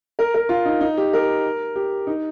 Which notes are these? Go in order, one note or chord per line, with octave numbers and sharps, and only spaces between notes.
A#4
A#4
F4
D#4
D#4
G4
A#4
G4
D#4